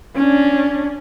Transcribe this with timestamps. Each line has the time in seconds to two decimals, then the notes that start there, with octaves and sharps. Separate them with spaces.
0.16 C#4 D4